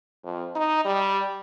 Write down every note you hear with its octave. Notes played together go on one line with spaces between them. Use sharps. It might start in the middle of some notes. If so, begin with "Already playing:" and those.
F2
D#4
G3